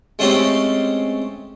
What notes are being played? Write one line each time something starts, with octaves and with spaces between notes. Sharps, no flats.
G#3 A3 C4 C#4 D#4 G4